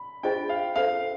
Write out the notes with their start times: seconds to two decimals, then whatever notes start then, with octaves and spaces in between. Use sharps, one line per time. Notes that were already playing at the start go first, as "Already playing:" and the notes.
Already playing: B5
0.23 D4 F4 G#4 C5 D#5 G5
0.49 F5
0.76 C#4 F4 A4 C5 F5